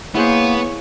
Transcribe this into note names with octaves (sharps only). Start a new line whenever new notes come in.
A#3 B3 E4 G#4 C5 C#5